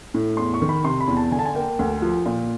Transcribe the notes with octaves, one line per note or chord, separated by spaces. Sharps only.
A2
E2 C6
C#6
D#3
B5
C3 C6
B5
E2
A5
D3 G#5
A5
G#5
A#3 G5
D2
F3
A#2